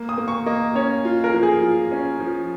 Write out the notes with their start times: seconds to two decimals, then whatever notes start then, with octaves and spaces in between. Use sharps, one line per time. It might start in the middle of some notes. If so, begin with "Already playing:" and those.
Already playing: A#3
0.09 D#6
0.18 A#3
0.28 C#6
0.46 A#3 D#5
0.75 C#4 C#5
1.05 F4
1.24 A#4
1.34 F3
1.43 G#4
1.63 F4
1.92 C#4
2.20 F3